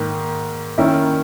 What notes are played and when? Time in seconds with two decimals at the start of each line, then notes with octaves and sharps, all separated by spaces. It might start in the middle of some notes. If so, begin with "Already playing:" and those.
Already playing: G#2 D#3 A#3
0.78 D#3 A#3 C#4 E4